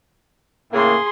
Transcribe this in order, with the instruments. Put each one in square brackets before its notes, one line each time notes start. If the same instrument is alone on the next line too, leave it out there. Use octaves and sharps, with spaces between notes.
[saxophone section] A2 C#3 A#3 [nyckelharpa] G#4 C6